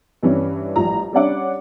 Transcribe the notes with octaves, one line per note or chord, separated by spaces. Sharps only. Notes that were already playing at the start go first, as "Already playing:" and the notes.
G2 E3 G3 C#4
A1 F3 G3 A#5
G3 C#4 D4 C#5 F#5 D6